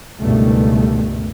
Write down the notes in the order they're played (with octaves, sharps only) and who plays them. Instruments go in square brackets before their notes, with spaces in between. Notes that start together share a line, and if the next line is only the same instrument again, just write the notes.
[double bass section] C#2 G2 B2 D#3 A3